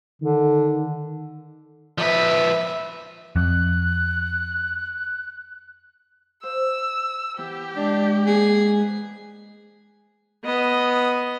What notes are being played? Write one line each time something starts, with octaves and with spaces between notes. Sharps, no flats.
D3 D#3
F3 B4 E5
F2 F#6
C5 F5 E6
E3 B3 E4 G4
G#3 D4 A5
A#3 B3 G#4
B4
B3 D#5